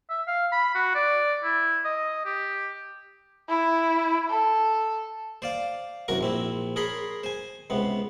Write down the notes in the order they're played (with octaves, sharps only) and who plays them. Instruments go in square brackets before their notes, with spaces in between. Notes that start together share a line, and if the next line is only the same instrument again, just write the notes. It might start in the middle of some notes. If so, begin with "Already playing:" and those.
[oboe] E5
F5
B5
F#4
D5
E4
D#5
G4
[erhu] E4
A4
[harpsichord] C5 D5 F5
C2 F#2 F#4 A#4 C#6
A#1 C4 E4
G#4 A#4 C#5 B5 C6
C5 G#5
C#2 C3 B3